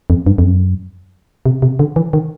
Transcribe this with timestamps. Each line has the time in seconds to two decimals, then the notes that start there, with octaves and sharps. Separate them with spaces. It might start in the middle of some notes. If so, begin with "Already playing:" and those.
0.10 F2
0.27 G2
0.38 F2
0.44 F#2
1.46 C3
1.62 C3
1.79 D3
1.96 E3
2.13 D#3